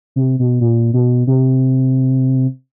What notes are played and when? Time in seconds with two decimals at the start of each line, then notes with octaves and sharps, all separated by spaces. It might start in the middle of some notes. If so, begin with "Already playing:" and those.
0.16 C3
0.39 B2
0.61 A#2
0.94 B2
1.27 C3